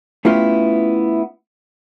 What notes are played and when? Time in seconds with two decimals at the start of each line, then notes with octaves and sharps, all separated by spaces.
0.25 A3 B3 C#4 E4 F4 G4